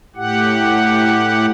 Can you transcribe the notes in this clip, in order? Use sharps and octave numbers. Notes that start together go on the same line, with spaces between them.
A2 G4 F#5